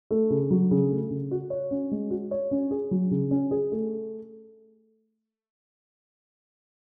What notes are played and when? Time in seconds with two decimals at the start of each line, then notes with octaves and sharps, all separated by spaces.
0.11 A3
0.30 C#3
0.51 F#3
0.71 C#3
0.91 A3
1.10 C#3
1.31 F#4
1.50 C#5
1.71 C#4
1.91 G#3
2.11 F#4
2.31 C#5
2.51 C#4
2.71 G#4
2.91 F#3
3.11 C#3
3.31 C#4
3.51 G#4
3.72 A3